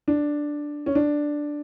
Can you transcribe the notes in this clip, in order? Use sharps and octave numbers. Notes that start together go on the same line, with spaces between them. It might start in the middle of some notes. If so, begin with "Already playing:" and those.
D4
C#4
D4